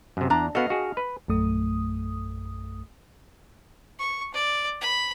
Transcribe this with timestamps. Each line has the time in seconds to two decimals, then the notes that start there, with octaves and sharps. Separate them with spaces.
0.17 F#2 C3
0.30 E2 D4 A#5
0.55 B3 F#4 A4 D#5 F5
0.70 F#4 G#4
0.97 B4
1.28 A#1 F#2 A3 D#6
3.99 C#6
4.34 D5
4.81 B5